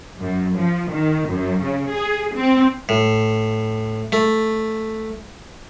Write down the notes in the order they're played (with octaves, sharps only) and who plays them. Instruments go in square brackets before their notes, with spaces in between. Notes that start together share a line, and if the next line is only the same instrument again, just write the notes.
[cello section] F#2
F3
D#3
F#2
C#3
G#4
C4
[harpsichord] A2
A3